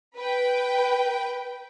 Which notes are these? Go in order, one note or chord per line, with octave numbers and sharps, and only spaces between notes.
B4 G5